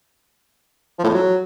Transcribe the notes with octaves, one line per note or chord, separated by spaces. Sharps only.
F3
A2
F2
F#3